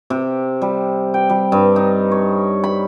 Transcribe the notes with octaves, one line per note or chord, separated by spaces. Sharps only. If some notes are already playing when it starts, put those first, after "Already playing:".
C3
G3
G5
G3
G2
D#4
C#5
B5